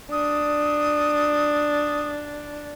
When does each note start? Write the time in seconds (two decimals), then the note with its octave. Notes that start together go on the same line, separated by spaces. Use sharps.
0.12 D4 D#6